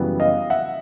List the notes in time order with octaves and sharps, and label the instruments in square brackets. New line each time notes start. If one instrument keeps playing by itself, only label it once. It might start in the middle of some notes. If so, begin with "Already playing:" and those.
Already playing: [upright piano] F#2 C#3 E3 G3 B3
D#5 F5
E5 F#5